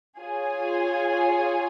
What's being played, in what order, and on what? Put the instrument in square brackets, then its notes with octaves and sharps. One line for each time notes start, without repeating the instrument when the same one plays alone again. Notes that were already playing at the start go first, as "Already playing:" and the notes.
[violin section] F4 G#4 C#5 G#5